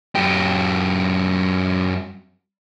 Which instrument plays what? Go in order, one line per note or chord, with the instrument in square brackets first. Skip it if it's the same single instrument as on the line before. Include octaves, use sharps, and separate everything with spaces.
[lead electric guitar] F#2 G4